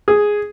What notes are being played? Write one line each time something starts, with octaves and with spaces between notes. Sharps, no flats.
G#4